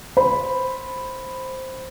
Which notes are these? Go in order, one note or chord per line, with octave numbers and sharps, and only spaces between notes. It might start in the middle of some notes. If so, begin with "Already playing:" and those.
C5 B5